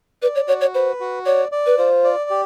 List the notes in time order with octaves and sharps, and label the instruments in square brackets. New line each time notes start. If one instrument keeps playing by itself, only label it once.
[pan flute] B4 [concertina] D5
[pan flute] C#5
[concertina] F#4 [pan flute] C#5
[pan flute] C#5
[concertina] B4 [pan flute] C5
[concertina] F#4
[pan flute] C#5 [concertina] D5
[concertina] D5
[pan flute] B4
[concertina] F4 [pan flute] C5
[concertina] D5
G4